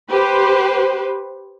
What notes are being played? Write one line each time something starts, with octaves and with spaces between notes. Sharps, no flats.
G4 B4 C5